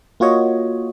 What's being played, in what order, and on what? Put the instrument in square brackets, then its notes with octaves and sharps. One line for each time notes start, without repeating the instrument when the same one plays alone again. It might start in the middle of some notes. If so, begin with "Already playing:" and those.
[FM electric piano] A#3 F4 F#4 C#5 D#5